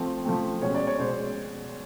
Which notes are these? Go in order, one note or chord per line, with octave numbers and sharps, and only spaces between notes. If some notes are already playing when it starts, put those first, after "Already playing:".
Already playing: F3 A3 C4
F3 A3 C4
B2 G#3 C#4 C#5
D5
C#5
B2 G#3 C5